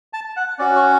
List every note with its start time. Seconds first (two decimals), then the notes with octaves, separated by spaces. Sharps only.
0.13 A5
0.37 F#5
0.59 C#4 F#4 D5
0.75 C#5